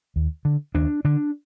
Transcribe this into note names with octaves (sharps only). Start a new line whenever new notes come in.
D#2
D3
D#2 D4
D3 D4